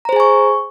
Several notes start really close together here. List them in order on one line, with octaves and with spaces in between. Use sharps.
A#5 C5 G#4 G#5 C#6